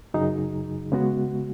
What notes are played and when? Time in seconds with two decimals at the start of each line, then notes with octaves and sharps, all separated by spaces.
0.14 F#2 C#3 F#3 D#4 G#4
0.92 C#3 G#3 B3 F#4